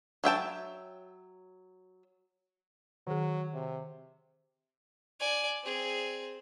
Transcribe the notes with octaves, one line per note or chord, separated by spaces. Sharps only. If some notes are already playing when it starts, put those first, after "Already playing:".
F#3 E5 G5 A5
D#3 F#3 G#4
C3
D5 G#5
C4 G#4